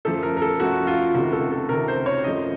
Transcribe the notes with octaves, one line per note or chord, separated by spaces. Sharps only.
F#2 F3 A3 A4
A#4
A#4
A4
F#2 F3 A3 F#4
F4
C#2 C3 D#3 A3 F#4
A4
A4
C#2 C3 D#3 A3 A#4
C5
C#5
F#2 F3 A3 D#5